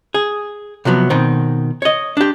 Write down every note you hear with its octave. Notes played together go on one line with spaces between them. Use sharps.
G#4
C3 F3 F#3 B3
B2 D#3 C4
C#5 D#5
D4 G4